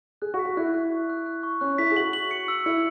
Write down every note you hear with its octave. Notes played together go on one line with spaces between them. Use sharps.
G#4 F#6
F#4
B6
F#4
E4 F#6
F#6
C#6
F#6
F#6
C#6
C#4 F#6
E4 B6
G#4
F#4 F#7
F#7
C#7
E6
E4 C#7